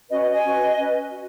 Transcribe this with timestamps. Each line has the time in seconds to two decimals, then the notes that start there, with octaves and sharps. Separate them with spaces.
0.09 C#4 F#4 B4 D#5
0.21 D#5
0.32 D#5 G#5
0.43 C#4 F#4 B4
0.78 C#4 B4
1.10 F#4